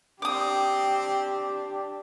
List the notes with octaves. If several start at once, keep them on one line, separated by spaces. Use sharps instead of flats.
C4 D4 G4 D6 D#6